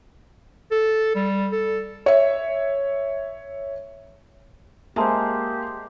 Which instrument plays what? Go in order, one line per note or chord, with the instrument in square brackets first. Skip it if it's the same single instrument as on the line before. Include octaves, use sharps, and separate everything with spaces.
[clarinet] A4
G3
A4
[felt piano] C#5 E5
[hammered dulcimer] G#3 [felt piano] A#3 C5 [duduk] G4 [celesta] E5 A5 C6